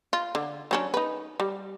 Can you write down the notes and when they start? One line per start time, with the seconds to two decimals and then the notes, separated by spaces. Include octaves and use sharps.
0.13 F4
0.35 D3
0.71 F#3 C#4 D4
0.94 D#4 B4
1.40 G3